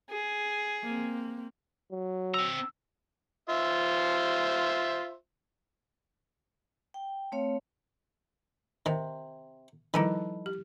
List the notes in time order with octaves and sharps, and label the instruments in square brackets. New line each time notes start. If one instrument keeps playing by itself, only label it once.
[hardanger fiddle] G#4
[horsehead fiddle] A#3 C4
[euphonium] F#3
[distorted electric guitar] C4 A#5 [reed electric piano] E6
[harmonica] F4 C5 E5
[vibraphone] G5
A3 C4 C#5 F5
[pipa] C3 [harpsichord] D#3
[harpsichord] D#3 [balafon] F3 G3 E4 [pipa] D#4 A4 B4
[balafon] G4